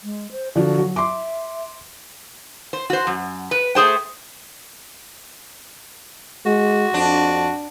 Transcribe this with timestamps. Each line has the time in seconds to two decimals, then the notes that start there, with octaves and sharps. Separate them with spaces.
0.04 G#3
0.32 C5
0.56 D3 F3 F#4
0.78 F#3
0.96 E5 C6 D6
2.73 C5
2.90 F#4 C5
3.07 F#2
3.51 B4
3.75 A3 G#4 C5 G5
6.46 G#3 F#4
6.94 F2 D4